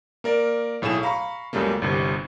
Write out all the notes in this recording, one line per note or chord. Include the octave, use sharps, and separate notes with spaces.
A#3 A#4 D5
B1 A2 A3 G#4 E7
F5 A#5 B5 C#6
C#2 F#2 C#3 G3 A3 A#3
G1 C2 C3